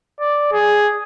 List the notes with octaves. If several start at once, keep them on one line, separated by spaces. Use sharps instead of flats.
D5
G#4